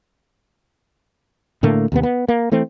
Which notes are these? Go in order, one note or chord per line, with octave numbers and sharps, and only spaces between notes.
A2 D3 A3 A#3
D#2 C3 B3
B3
A#3
E3 A3 C4